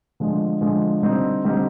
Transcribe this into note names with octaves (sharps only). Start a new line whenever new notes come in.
D3 F3 G#3
D3 F3 G#3
D3 G3 C4 D#4 G4
D3 G3 C4 D#4 G4